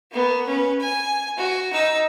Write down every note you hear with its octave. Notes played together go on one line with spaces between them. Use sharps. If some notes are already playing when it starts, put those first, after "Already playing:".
A#3 B3
C#4 B4
G#5
F#4
D#4 E6